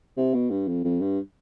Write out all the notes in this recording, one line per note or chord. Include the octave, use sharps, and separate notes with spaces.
C3
B2
G2
F2
F2
G2